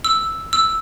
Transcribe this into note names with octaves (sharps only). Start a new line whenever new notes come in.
E6
E6